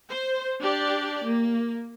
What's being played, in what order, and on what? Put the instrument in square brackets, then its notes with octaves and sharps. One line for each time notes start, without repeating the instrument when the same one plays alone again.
[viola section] C5
D4 G4 D5
A#3